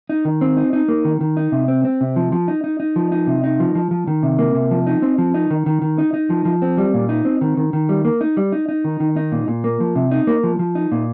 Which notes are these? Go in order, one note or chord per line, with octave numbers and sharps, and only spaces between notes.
D#4
D#3
C4
D#4
D#4
A#3
D#3
D#3
D#4
C3
C4
C4
C3
F3
F3
D#4
D#4
D#4
F3
D#4
C3
D#4
F3
F3
F3
D#3
C3
A#3
C3
F3
D#4
C4
F3
D#4
D#3
D#3
D#3
D#4
D#4
F3
F3
C4
G3
A#2
D#4
C4
D#3
D#3
D#3
G3
A#3
D#4
G3
D#4
D#4
D#3
D#3
D#4
A#2
A#2
A#3
F3
C3
D#4
A#3
F3
F3
D#4
A#2